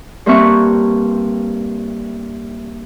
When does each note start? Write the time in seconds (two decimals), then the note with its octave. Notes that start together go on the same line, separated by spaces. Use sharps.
0.26 G2 A#3 C4 E5 C#6 F#6